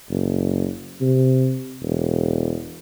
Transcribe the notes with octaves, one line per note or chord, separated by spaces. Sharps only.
F#1
C3
E1